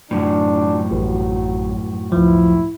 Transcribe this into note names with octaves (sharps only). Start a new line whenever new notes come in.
F#2 A2 D4
A1 F#3
C#2 F3 E4